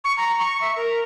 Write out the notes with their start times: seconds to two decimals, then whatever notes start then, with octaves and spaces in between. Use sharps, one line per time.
0.04 C#6
0.17 A#5
0.39 C#6
0.61 E5
0.76 A#4